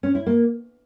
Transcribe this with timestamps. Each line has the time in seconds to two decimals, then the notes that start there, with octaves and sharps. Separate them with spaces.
0.03 C#4
0.15 E4
0.26 A#3